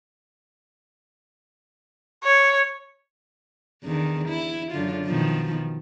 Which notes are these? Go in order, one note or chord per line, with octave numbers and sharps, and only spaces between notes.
C#5
E2 D3 D#3
E4
F#2 D3 F4
B2 D#3 F3